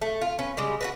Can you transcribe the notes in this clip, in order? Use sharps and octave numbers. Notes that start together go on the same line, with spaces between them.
A3
F4
C#4 B4
C#3 G3 G#3
F#4 A#4 B4